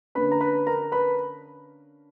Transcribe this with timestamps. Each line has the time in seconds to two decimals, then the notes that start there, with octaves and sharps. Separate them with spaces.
0.15 D3 A#3 C#4 B4 B5
0.32 A#5
0.41 B4 B5
0.67 A#4 A#5
0.92 B4 B5